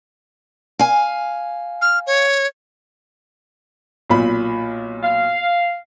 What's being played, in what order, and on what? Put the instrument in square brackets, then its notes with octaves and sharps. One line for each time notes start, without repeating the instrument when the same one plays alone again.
[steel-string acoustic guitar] F5 G#5
[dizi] F6
C#5
[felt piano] B1 A#2 B5
[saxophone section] F5